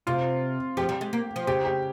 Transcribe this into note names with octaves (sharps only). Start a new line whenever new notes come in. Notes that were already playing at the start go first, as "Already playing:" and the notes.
C3 F4
F3 G4
G3
G#3
A#3
F3
C#3 G4
G4